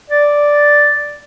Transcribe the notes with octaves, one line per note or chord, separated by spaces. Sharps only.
D5